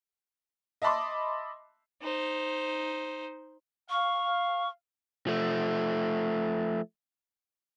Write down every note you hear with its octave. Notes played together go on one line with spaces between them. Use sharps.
D#5 E5 A5 B5 C6 D6
D#4 C5
F5 C#6
F3 A3